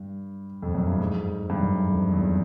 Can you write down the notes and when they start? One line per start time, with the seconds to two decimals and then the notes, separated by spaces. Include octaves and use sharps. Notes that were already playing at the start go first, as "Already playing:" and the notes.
Already playing: G2
0.62 F2
0.75 F#2
0.87 G2
0.99 G#2
1.50 G2
1.59 F#2
1.89 F2
2.12 E2